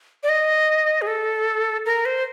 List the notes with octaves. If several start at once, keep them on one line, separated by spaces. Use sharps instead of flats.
D5
D#5
G#4
A4
A#4
C5